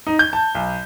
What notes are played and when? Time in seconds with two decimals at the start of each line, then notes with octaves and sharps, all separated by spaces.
0.07 D#4
0.19 G6
0.33 A5
0.55 B1